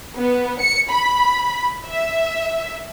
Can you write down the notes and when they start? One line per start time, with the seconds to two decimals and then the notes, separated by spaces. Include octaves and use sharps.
0.18 B3
0.61 C#7
0.92 B5
1.88 E5